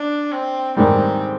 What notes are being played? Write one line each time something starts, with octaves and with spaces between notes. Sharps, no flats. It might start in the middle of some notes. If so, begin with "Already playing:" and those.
Already playing: D4
C4
G#2 D#3 G3 C4